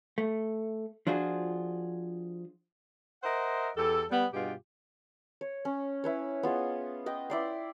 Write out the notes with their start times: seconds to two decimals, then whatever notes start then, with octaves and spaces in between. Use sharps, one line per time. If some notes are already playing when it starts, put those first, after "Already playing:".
0.18 A3
1.07 F3 D4 F4 F#4 G#4
3.23 A#4 C5 D#5 E5 F#5
3.77 E2 G4 A4
4.10 G3 B3
4.33 G2 B2 F4 G4 G#4
5.41 C#5
5.65 C#4
6.04 E4 B4 C#5
6.43 B3 F4 G#4 D#5
7.06 B4 D#5 G5
7.30 E4 D5 C6